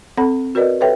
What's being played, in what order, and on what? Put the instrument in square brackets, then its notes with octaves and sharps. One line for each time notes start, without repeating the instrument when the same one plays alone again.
[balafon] C4 A4 F#5 B5
F#4 A#4 B4 D5 D#5
G4 A4 B4 C#5 E5 G5